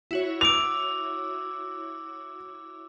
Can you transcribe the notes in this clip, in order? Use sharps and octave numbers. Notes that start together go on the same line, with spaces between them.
E4 F#4 C#5
D6 E6 D7 F7